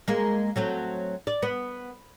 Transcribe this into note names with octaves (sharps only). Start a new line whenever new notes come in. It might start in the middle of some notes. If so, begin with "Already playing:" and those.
G#3 A#3
F#3 A3 C4
D5
B3